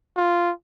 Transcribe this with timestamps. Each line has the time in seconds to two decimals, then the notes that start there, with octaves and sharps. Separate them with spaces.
0.17 F4